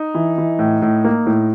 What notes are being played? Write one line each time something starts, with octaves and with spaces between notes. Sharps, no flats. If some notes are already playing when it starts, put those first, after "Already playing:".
Already playing: D#4
E3
E3
A2
A2
A#3
A2